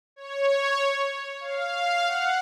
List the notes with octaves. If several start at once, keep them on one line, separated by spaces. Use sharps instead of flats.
C#5
F5
F#5